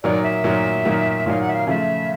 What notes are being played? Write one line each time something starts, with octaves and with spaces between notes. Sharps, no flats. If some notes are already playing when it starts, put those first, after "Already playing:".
A#2 F#3 A#3 D#4 D5
E5
A#2 F#3 A#3 D#4
A#2 F#3 A#3 D#4
A#2 F#3 A#3 D#4 F5
F#5
E5
F5
C#3 F3 A3 E5